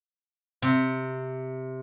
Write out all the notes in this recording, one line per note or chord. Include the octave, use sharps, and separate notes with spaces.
C3